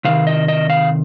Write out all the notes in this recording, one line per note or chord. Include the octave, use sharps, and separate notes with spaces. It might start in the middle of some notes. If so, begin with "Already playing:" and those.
C3 D#3 F5
D#5
D#5
F5